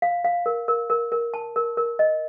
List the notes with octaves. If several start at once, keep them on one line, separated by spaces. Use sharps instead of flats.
F5
F5
A#4
A#4
A#4
A#4
A5
A#4
A#4
D#5